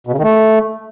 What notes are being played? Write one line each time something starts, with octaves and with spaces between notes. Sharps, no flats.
B2
C#3
D#3
A3